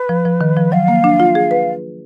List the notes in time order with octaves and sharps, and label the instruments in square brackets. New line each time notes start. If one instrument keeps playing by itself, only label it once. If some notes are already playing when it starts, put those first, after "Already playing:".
Already playing: [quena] B4
[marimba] F3
F3
D#3
F3
[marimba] F#3 [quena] F5
[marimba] A#3
D4
F4
G#4
B4